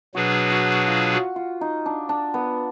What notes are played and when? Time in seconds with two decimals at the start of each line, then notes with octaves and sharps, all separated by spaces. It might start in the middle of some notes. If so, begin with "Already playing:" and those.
0.15 B2 F#3 D4 F#4 G#4 B4
0.51 F#4
0.88 F4
1.13 F#4
1.36 F4
1.61 D#4
1.86 D4
2.09 D4
2.34 B3